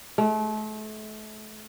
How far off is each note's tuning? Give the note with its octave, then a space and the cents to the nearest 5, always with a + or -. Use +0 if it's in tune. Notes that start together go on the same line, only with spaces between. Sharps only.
A3 -35